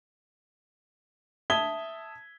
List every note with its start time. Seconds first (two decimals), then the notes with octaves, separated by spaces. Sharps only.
1.50 E5 A5 D#6 G#6 B6 G7